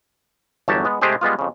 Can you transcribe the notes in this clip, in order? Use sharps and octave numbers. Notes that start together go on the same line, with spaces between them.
G1 E2 F#3 G4 C#5 A5
G#3 B3
C3 G#3 A3 C4 G4 G#4
G3 G#3 B3 F4
F2 C#3